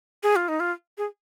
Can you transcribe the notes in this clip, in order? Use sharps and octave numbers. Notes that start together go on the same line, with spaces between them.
G#4
F4
D#4
F4
G#4